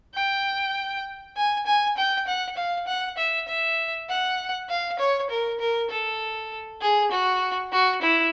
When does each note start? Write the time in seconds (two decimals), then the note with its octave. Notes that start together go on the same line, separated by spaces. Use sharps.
0.14 G5
1.37 G#5
1.66 G#5
1.97 G5
2.27 F#5
2.57 F5
2.87 F#5
3.18 E5
3.48 E5
4.09 F#5
4.70 F5
4.99 C#5
5.30 A#4
5.60 A#4
5.91 A4
6.81 G#4
7.11 F#4
7.72 F#4
8.02 E4